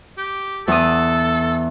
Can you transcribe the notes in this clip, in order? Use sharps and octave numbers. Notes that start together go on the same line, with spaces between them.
G4
E2 A4 D#6